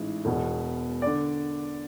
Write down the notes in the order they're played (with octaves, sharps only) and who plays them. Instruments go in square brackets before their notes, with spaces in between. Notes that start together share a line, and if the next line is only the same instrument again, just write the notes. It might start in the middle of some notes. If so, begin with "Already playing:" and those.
Already playing: [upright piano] A1 G#2 E3 G#3
E1 E2 B2
D3 D5